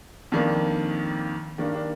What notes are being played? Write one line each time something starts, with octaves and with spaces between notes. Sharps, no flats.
F2 D#3 A#3 D4
G2 D#3 A#3 D4
D4